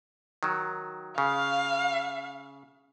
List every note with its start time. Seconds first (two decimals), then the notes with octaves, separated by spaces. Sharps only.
0.43 D#3 F#3
1.18 C#3 F5